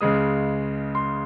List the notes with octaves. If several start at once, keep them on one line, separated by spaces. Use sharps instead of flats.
C#2 C#3 G#3 D#6
C6